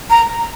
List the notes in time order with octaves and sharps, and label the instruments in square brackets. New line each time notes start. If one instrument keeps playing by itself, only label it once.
[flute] A#5